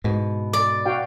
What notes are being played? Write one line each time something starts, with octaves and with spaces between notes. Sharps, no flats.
G#2 B2
D5
F#4 F5 G5